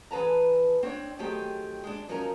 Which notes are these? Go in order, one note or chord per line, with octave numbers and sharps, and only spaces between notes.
E3 G#4 B4 A5 A#5
C4 D4 C#5
D#3 F#3 A3 C4 G4 G#4
G#3 D4
F3 F#3 C#4 D#4 A#4